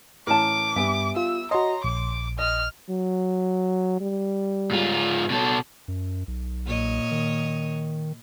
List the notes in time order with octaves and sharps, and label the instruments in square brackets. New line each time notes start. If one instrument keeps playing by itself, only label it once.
[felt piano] A2 E3 C#4 [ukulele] A#4 A5 [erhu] D6
[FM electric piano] G2 [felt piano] G3 B3 [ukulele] E5 G#5
[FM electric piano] F4 [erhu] E6
[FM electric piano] F#4 D#5 [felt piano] C#5 C6 [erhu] A#5
[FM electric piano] A#1 [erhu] D6
[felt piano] D#5 [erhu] F6
[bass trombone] F#3
G3
[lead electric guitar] G#2 F4
B2 A4
[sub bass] F#2
B1
[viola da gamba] A#2 C#5 D#5
[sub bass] D#3